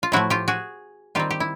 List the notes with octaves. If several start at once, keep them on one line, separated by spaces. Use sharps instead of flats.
F4
A2 F3 A3 E4 F#4
F4 G4
F#4 G#4
D#3 G3 C4 F4 G4
G4
E4